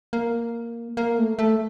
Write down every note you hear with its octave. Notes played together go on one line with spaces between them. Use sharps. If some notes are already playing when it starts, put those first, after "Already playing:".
A#3
A#3
A3
A3